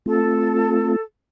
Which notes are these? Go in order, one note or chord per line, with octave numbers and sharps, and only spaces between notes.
A3 C4 F4 A4